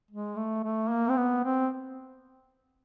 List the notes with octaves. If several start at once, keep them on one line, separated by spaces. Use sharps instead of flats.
G#3
A3
A3
A#3
C4
B3
C4